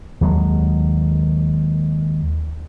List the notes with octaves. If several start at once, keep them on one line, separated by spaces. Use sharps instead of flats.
D#2 F#3 G#3